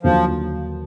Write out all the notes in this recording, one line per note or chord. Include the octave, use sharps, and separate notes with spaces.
D#2 D3 F3 F#3 D4